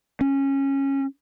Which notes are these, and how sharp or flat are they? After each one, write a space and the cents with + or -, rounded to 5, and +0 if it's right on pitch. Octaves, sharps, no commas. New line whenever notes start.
C#4 -15